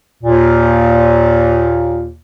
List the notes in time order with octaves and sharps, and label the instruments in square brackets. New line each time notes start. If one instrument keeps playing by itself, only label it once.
[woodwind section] D#2 A#2